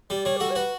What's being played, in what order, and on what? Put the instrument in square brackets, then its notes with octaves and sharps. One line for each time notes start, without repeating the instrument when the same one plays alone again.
[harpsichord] G3 [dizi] D5
[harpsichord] G3 [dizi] C#5
[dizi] G4
[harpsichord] F#4 [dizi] A4
[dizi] C#5
[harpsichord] F#4 [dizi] B4